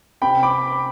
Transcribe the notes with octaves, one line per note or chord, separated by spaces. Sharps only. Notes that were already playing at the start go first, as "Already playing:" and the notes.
C3 G5 B5
B5 D6